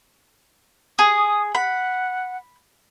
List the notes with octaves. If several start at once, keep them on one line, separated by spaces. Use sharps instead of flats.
G#4 D#6
F#5 B5